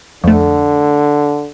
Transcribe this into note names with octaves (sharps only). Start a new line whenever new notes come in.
F2 D3 A3